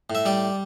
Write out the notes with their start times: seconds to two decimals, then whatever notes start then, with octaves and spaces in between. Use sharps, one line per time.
0.10 A2
0.15 E5
0.25 G3 D5